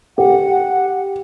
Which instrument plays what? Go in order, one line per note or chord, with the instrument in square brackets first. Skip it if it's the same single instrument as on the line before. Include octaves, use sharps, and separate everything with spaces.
[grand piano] G4 [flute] F#5